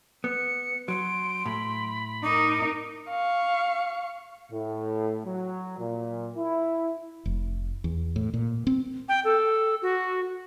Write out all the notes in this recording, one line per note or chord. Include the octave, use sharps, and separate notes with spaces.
B3 C#7
F#3 C6 D7
A2 B5
D#4 A#4 D6
F5 C#6
A2
F#3
A#2
E4
F1
E2
A2
A#2
C4
G5
A4
F#4